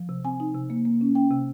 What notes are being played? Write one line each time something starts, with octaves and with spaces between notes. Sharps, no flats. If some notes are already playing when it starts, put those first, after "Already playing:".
Already playing: F3
C3
C4 G#5
D#4
C3
A#3
A#3
C#4
C#4 G5
C3